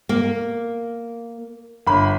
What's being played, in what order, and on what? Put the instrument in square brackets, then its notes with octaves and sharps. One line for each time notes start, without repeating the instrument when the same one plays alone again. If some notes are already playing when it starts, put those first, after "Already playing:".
[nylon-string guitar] A#3
[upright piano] G1 B5